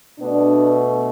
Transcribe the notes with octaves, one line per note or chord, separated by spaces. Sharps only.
B2 A3 B3 D4